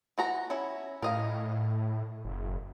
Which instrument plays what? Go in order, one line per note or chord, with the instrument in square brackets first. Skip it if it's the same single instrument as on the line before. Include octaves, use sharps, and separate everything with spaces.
[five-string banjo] E3 F#4 A#5
C#4 E4
[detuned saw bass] A2 [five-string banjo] A#4 D#5 F5
[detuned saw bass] F#1